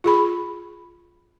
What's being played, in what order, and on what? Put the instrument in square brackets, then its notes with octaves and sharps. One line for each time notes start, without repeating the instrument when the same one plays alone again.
[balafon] F4 G#4 B5